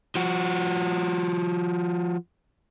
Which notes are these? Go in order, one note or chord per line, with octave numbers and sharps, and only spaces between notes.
F3 F#4